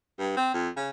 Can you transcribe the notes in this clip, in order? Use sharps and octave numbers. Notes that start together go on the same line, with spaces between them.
G2
C4
F2
C#3